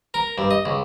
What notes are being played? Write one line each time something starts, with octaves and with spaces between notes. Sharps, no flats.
A#4
G2
D#5
C#2